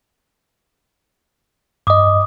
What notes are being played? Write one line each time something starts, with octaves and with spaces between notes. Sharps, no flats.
G2 D#5 D6 D#6